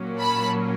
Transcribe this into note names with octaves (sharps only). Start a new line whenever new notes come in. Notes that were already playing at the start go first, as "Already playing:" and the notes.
Already playing: A#2 F#3 A#3 C#4
A5 B5